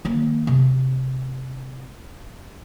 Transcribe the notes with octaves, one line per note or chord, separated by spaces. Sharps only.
D#3 A#3
C3